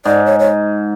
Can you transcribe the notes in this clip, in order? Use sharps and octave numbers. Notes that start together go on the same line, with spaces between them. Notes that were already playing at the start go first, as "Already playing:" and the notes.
G#2 D5
C#5
C#5